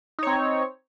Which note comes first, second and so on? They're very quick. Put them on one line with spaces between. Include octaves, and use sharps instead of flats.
D#4 C#5 C4